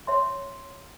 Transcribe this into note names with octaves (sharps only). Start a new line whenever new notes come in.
C#5 E5 C6